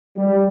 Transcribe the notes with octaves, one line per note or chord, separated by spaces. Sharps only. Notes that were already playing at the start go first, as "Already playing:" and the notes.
G3